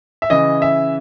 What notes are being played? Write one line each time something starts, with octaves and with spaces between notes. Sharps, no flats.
E5
C#3 E3 D#5
E5